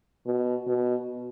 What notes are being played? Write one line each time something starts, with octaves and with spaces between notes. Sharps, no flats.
B2
B2